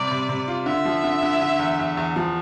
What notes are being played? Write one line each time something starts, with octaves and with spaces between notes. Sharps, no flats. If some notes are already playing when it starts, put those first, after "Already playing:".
Already playing: C3 G3 D5
C3
C3
F4
D3 E5
F3
D3
D3
D3
E2
E2
E2
F3